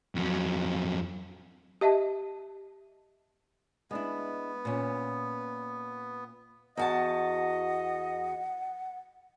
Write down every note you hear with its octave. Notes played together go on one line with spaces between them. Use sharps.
F2 F#3
G4 D#5 E5 A5
G#3 B3 D4 E4
A#2 C#4
E2 F#4 D#5 F#5 A5